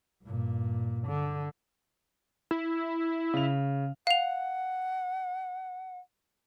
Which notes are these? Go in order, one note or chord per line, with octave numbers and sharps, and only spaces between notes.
G2 A#2
D3
E4
C#3 F7
F5 F#5 F7